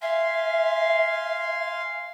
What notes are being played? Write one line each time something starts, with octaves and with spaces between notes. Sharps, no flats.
E5 F5 G#5 C6